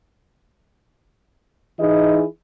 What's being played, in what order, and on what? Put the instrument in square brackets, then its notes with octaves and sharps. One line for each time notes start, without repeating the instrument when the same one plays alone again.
[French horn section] E3 D#4 E4 G#4 D#5